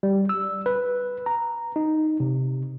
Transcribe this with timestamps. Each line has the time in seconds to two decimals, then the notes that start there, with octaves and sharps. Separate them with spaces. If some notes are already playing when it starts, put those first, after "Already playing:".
0.03 G3
0.29 E6
0.66 B4
1.26 A#5
1.76 D#4
2.20 C3